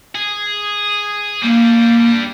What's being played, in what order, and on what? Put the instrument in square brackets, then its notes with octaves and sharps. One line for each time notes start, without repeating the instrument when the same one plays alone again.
[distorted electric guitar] G#4
[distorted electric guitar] G3 D4 [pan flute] A#3